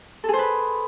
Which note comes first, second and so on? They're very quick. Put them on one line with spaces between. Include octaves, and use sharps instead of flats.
A4 G#4 C5 B4